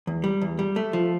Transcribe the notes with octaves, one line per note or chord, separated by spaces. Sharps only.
E2
G3
E2
G3
A3
F3